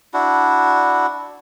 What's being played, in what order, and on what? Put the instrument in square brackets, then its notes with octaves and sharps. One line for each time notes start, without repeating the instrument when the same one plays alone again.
[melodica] D4 E4 F#4